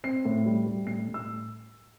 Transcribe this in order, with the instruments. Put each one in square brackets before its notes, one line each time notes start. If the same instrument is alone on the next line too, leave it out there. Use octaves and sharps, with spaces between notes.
[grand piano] C4 C7
A2
G3
G3
A2 C7
A2
E6